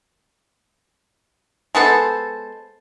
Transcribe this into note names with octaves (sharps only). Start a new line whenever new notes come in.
G#3 B3 A4 C5